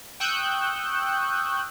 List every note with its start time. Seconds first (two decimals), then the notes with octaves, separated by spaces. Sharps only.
0.20 G5 C#6 D#6 E6 F#6 G6